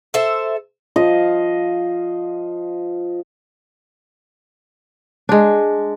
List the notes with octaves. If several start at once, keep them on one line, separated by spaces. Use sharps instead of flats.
A4 C5 E5
F3 D#5 F5
G#3 D4